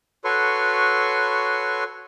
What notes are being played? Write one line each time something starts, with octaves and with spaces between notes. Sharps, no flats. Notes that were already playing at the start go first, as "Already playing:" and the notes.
F#4 A4 B4 C#5 C6 C#6